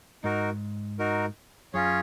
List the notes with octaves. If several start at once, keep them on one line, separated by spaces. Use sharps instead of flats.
G#2 D#4 F#4 A#4
D#4 F#4 A#4
F#2 C#4 F4 G#4 C#5